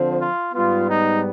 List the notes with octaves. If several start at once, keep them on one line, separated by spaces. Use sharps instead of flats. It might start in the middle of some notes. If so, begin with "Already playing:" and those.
Already playing: D3 F3 C4
F4
G#2 G3 B3 F4
D#4